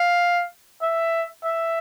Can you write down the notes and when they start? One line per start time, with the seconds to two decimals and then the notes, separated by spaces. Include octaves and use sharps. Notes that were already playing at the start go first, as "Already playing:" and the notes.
Already playing: F5
0.82 E5
1.45 E5